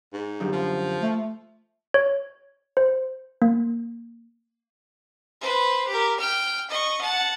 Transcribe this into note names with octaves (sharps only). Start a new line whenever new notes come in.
G#2
F#2 D3 G3
F3
A3
C#5
C5
A#3
B4 C5
G4 A#4
G5 F6
D#5 C#6
F#5 A5